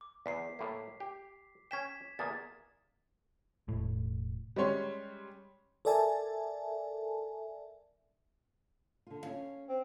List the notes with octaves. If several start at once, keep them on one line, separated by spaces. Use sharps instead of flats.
D6
E2 B6 C7
A2 A#3
G4
C#4 G5 G#6 B6 E7
E2 A#3 G#4 A6
E1 A2
G3 G#3 C#4 C#5 C6
A4 A#4 D5 E5 G#5 A5
D3 F4
C#4 F5
C4